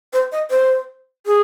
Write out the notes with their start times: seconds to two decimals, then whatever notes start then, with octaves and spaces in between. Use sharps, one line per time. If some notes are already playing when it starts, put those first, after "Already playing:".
0.13 C5
0.32 D#5
0.50 C5
1.26 G#4